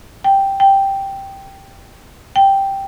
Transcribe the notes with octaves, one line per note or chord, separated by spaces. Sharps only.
G5
G5
G5